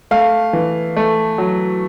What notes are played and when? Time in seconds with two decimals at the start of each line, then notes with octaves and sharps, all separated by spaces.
0.11 A3 F5
0.53 E3
0.97 A3
1.38 F#3